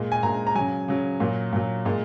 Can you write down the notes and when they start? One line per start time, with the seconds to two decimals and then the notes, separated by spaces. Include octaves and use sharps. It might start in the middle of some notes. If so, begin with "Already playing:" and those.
Already playing: A#2 G#3
0.12 G#5
0.23 A#2 G#3 A#5
0.47 A#5
0.55 C#3 F#3 G#5
0.88 C#3 F#3
1.20 A#2 F#3
1.53 A#2 F#3
1.85 A#2 G#3